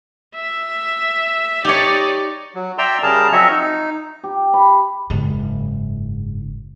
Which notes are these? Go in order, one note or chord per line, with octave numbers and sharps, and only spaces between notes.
E5
D#4 G4 C#5 D5
F#3
D5 E5 G5 A#5 C6 E6
C#3 G3 G#4 A#4 A5 A#5
F3 F#3 C4 C#5 D#5 E5
D#4
G4
B5
F#1 G#2